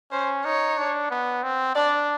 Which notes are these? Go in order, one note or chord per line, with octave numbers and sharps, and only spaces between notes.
C#4 C5
D#4 C#5
D4
B3
C4
D4 D5